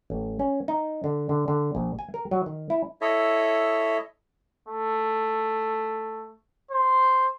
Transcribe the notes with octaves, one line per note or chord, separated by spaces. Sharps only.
A1
C#4
D#4
D3
D3
D3
A#1
G#5
A#4
F#3
D#3
E4
E4 A4 C#5 D#5 E5
A3
C5